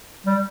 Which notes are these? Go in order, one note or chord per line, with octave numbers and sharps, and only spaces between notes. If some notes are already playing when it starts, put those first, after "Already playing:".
G3